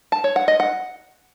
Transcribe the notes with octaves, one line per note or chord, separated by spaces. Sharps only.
A5
C#5
F#5
D#5
F#5